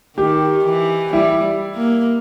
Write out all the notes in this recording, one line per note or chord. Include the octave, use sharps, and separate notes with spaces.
D#3 G4
E3
G3 E4
A#3